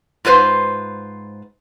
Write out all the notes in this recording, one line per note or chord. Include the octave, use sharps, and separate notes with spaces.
G#2 F4 B4 C5